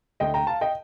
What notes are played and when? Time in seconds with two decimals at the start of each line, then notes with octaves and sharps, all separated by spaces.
0.20 D2 D3 A3 D#5 G5
0.34 G5 A#5
0.47 F5 A5
0.61 D#5 G5